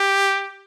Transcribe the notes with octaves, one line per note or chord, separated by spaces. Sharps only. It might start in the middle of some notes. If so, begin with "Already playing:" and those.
Already playing: G4